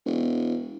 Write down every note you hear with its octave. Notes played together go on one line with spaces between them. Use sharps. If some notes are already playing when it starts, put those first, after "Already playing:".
E1